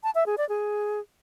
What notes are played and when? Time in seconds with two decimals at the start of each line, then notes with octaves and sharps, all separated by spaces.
0.03 A5
0.15 E5
0.26 G#4
0.38 D5
0.49 G#4